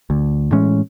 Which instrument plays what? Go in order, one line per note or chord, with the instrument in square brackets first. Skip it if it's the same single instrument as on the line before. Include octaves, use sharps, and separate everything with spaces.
[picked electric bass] D2 D3
A2 E3 G#3 C#4